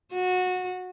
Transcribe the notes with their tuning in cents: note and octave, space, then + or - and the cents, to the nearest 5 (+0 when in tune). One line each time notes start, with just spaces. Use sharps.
F#4 -20